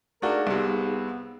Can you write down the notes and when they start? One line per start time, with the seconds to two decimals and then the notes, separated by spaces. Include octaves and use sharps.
0.22 A3 D4 D#4 F#4 G#4 A#4 F5
0.47 C2 C3 B3